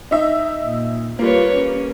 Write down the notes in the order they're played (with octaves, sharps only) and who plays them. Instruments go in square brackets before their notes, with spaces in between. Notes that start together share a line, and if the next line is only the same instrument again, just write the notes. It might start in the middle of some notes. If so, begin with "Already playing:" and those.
[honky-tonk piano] D#4 E5
[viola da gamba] A#2
[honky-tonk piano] G3 A#3 [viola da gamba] F4 B4 C#5
[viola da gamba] C#4